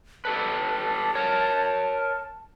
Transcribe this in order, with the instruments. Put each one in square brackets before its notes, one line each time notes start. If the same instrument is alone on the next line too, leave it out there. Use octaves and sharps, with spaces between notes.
[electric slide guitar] G4 A4 B4 [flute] A5
[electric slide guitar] A#4 C#5